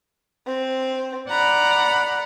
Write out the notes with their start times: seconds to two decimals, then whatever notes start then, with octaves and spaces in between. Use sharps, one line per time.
0.46 C4
1.29 D5 F#5 A#5 B5